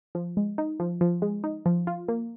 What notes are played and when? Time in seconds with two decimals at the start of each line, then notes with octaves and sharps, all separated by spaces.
0.15 F3
0.37 G#3
0.58 D#4
0.80 F3
1.01 F3
1.22 G#3
1.44 D#4
1.66 F3
1.87 F4
2.08 A#3